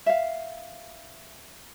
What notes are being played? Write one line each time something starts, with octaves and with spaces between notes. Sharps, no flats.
E5 F5